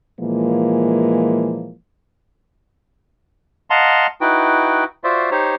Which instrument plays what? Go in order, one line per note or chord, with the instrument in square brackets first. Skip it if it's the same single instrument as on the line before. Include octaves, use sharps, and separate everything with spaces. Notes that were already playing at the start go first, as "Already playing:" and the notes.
[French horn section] A#2 E3 F3 G#3 A#3
[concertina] D#5 F5 F#5 A5 A#5 C6
D#4 E4 F#4 B4 G5
F4 F#4 C5 D5 E5
D#4 G4 C5 C#5